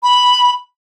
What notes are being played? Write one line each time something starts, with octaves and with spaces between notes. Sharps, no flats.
B5